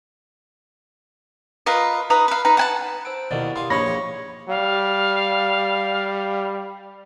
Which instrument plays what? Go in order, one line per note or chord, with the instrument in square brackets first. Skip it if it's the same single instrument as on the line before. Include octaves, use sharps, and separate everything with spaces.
[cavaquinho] F4 A#4 B4 D#5
D#4 B4 A#5 D#6
B4 F5
D#4 B4 A#5
F#5 G#5 A5
[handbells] C5 E6 D7
[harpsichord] D#2 B2 [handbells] E4 A#4 D5
[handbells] G4 [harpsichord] G#4 F5 [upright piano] C6
[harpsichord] A#1 D#4 C5 [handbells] A#3 [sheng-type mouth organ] C#5 [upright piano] B5 A#6
[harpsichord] A#1 G4
[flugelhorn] G3 [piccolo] F5